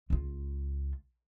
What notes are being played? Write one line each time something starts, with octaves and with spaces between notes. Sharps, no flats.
C#2 F4